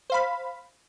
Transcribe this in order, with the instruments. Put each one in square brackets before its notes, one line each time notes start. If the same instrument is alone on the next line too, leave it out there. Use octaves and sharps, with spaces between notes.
[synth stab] C5 F5 B5